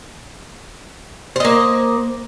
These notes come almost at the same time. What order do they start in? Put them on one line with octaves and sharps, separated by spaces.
C5 D#5 A#3